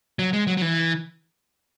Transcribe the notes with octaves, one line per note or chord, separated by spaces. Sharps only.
F#3
G#3
F#3
F#3
E3